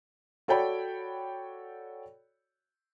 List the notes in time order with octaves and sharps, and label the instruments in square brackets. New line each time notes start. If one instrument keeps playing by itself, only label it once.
[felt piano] F#4 A4 C#5 D5 G5 B5